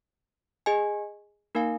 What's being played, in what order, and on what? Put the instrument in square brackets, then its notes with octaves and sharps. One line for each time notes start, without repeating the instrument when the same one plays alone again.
[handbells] G#4 D#5 G#5
A#3 D#4 A#4 F5 G#5